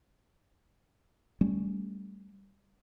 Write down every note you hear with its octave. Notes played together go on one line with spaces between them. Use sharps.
G3 A3 C#4